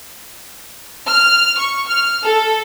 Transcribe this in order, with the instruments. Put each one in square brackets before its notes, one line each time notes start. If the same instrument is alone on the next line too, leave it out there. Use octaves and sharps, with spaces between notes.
[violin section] F6
C#6
F6
A4